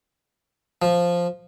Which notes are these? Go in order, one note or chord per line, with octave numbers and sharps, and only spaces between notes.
F3